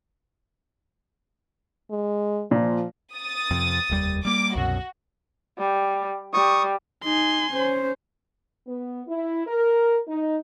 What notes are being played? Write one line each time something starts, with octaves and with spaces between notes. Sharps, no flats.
G#3
A#2 F3
D#6 A6
F2 C3
F1 D#2 G3
G3 A#3 D6
C2 F#2 B2 F#4
G3
G3 C#6 D#6
D#4 G#5 C6
C#4 C5
B3
E4
A#4
D#4